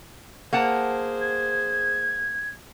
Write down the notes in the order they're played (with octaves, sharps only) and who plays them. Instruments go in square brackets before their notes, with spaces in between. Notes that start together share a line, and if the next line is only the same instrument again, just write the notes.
[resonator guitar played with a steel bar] A#3 F#5 A5 [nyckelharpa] G#4 C5
[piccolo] G#6